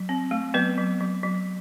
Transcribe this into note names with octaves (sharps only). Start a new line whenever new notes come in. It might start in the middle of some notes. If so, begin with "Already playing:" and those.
Already playing: F#3
C4
A3
F#3 B3 B4
F#3
F#3
F#3